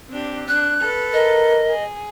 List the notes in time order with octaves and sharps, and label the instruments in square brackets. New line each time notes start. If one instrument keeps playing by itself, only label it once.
[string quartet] C4 D4 G4
[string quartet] D4 [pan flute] F#6
[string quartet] A4 B4
[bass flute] A#4 [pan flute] D#5
[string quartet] G#4